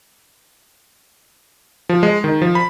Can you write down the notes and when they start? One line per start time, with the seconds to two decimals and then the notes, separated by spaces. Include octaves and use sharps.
1.89 F3
2.03 G#3
2.24 D#3
2.42 F3
2.55 B5